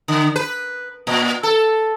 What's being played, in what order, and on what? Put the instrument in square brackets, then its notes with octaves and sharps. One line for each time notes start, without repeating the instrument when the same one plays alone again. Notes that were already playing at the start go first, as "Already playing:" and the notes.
[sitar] D3
B4
A#2
A4